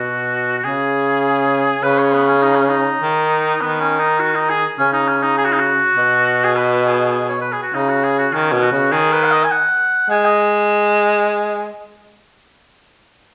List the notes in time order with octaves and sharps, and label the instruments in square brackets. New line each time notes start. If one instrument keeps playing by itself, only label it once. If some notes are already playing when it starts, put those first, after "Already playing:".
Already playing: [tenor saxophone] B2 [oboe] F#4
[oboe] F#4
[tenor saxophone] C#3 [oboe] G#4
[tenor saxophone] C#3 [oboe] B4
[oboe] C#5
B3
C#4
D#4
C#4
D#4
[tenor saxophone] D#3
[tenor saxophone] D#3 [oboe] B3
[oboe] C#4
D#4
F#4
D#4
G#4
[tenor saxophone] C#3 [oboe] C#4
[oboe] D#4
C#4
D#4
G#4
F#4
D#4
F#4
[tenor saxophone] B2
[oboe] G#4
B4
G#4
C#5
B4
G#4
F#4
[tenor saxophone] C#3 [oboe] D#4
[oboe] F#4
G#4
F#4
[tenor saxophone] D#3 [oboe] C#4
[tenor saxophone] B2
[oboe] F#4
[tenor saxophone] C#3
[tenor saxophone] D#3 [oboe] G#4
[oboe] B4
F#5
D#5
G#5
F#5
[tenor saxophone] G#3 [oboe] G#5
[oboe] D#5